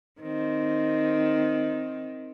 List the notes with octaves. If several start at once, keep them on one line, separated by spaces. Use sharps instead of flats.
D#3 C4